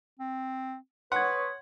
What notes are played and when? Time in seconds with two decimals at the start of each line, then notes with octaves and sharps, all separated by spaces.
0.20 C4
1.12 B4 C#5 F#5 C6 C#6 D#6 G#6